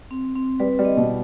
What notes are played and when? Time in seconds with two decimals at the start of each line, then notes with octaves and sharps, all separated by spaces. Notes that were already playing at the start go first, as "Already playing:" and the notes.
0.11 C4
0.35 C4
0.60 G3 B4
0.79 G3
0.85 D#5
0.97 B2